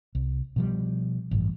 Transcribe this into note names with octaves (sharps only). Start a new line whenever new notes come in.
C2
B2 F3 G3
A1 G2